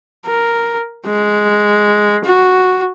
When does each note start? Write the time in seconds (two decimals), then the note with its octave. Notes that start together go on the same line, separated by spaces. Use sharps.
0.26 A#4
1.06 G#3
2.24 F#4